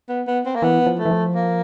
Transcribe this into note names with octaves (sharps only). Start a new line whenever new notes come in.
B3
B3
C4
A#3
E3 B3
F3
A3
E3
F3
A#3